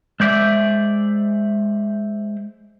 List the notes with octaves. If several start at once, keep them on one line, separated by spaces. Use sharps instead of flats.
G#3 C5 D5 E5